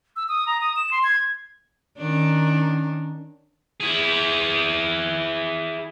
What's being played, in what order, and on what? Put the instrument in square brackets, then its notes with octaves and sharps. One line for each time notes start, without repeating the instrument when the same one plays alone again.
[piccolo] E6
D#6
A#5
D#6
E7
C6
G#6
[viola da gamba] D#3 C#4 D4
[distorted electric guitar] E4 G#4